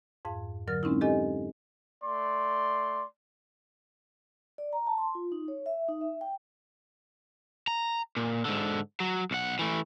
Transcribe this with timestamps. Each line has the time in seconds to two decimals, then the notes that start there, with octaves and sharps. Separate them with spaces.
0.25 F2 G#2 F5
0.68 D3 F#3 A#4 F6 A6
0.83 G#3 C4 C#4 D#4 E4
1.01 G4 A4 D#5 G#5
2.04 A3 D5 C6
4.58 D5
4.73 A#5
4.87 A5
4.98 C6
5.15 F4
5.32 D#4
5.48 C#5
5.66 E5
5.89 D#4
6.01 E5
6.21 G5
7.68 A#5
8.17 A#2
8.45 G#2 D3
9.00 F#3
9.31 B1 F#5
9.59 E3 A3